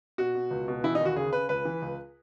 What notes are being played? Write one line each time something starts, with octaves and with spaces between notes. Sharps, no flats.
B2 F#4
B2
C#2
B2
E3 E4
D#4
D#2 F#4
C#3 G#4
C#3 B4
C#2 B4
E3
C#2